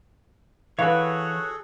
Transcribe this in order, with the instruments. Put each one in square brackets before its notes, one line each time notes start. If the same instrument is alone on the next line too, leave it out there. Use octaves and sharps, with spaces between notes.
[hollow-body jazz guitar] E3 [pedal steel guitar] F#4 C#5 [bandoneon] G#4 A4 [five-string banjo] B4 F5